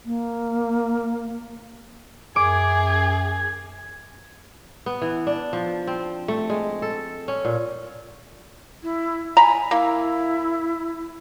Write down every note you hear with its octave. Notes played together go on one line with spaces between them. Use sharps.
A#3
F#2 G#4 D6 G#6
B3
E3
D4
F3
C4
A3
G#3
A4
C#4
A#2
E4
G#5 A#5 B5
A#3 E4